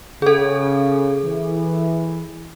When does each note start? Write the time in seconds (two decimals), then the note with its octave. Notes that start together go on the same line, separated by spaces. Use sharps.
0.22 C#3 G#4 A4
1.24 E3